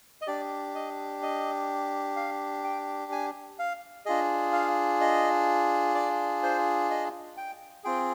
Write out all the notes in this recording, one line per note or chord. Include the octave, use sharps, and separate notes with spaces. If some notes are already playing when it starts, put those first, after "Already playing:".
D#5
D4 G4 D5
D#5
D#5
F5
G5
G#5
F5
D4 F4 G#4 D#5
F5
D#5
D5
C5
D#5
G5
C4 F4 G#4 G5